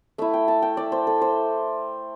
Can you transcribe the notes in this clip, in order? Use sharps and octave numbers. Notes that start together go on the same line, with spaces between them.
A3 E4 E5
G5
A5
G5
D5
C5
A4
C5